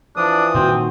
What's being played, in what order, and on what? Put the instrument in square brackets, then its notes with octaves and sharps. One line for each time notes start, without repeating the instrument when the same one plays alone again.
[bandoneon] E3 F3 D#6 [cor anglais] D4
[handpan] A#2 D#3 F#4 [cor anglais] C4